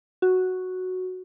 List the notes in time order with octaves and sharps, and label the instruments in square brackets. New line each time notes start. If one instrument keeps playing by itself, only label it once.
[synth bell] F#4